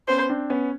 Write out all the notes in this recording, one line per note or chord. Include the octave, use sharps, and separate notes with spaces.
B3 C#4 C5
C4 D4
B3 C#4